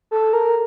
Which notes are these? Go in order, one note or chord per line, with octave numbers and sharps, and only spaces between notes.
A4
A#4